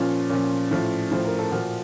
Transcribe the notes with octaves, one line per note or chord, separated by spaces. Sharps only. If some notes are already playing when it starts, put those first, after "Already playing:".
Already playing: A#2 F3 C#4
A#2 F3 C#4
A2 F3
A2 F3 C5
A#4
A4
A#2 F3 F#4